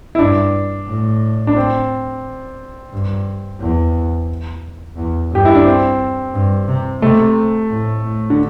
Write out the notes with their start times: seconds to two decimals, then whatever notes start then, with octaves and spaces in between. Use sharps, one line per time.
0.15 E4
0.19 G2 D4
0.88 A2
1.47 D4
1.57 C4
2.92 G2
3.60 E2
4.97 E2
5.31 G2 G4
5.45 E4
5.55 D4
5.66 C4
6.34 G2
6.68 C3
7.02 C3 A3
7.71 A2
8.05 A2
8.30 D3